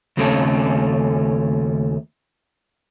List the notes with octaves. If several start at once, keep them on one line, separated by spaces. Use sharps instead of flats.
D#2 C#3 A3 C4 C#4 A4